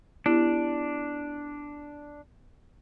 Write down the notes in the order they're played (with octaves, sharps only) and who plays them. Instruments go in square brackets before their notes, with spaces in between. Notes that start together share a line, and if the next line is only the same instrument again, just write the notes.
[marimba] B3 E4 G4 [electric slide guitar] D4